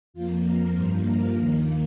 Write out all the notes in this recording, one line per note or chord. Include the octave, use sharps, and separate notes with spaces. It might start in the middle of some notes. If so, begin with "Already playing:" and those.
F2 F3 A#3 F4
A#4
G2 F3 A#3 C5
A#4
D#2 D#3 A#3